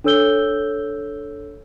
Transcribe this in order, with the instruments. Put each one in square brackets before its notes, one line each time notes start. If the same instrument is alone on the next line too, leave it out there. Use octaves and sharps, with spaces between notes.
[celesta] D4 A4 C#5 E6 G6 G7